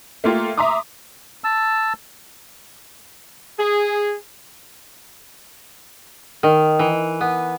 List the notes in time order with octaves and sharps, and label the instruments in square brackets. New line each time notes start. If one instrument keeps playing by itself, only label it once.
[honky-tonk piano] A3 A#3 F4 G4
E5 A#5 C6 D6 D#6
[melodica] A5 E6
[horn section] G#4
[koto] D#3
E3
B3